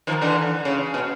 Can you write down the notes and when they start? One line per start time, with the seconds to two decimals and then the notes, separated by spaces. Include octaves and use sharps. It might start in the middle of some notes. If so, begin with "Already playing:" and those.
0.07 D#3 F3
0.22 D3 E3
0.65 C#3
0.94 B2